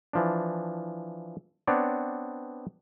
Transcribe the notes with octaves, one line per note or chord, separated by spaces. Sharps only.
E3 F3 D4
B3 C4 D4 C#5 D5